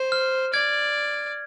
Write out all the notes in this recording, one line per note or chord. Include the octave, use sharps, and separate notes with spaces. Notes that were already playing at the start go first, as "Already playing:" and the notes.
Already playing: C5
F6
D5 G#6